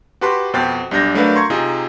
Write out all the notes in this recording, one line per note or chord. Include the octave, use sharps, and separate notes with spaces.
F#4 G4 B4 A5 C6 F#6
F2 B2 C5 G5 F#6 A6
B1 G3 D4 G6 A#6
F#3 A3 D4 A#4 B4 F5
A#5 C6 C#6 G#6
C3 D#4 F4 G#4